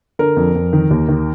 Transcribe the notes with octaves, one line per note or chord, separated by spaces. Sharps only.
D3 A#4
F2
F2
D#3
D#2
D#3